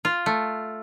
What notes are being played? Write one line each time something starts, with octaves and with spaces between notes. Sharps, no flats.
F4
A3